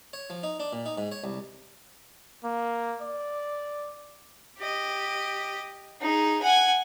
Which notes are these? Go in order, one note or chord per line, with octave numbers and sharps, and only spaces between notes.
C#5
F3
D#4
D4
A#2
D#4
G#2
C#5
C2
A#3
D5
G4 D#5
D#4 G#4
F#5 G#5